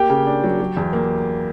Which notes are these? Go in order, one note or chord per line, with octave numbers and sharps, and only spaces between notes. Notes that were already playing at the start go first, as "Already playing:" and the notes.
Already playing: A#3 G4 G5
C#3
D4
F#3
F#3
E2
A#3